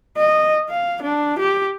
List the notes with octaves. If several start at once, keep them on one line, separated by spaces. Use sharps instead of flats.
D#5
F5
D4
G4